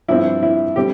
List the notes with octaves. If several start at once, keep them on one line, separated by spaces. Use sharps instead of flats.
G2 F3 C4 E4
E4
D3 G3 C4 G4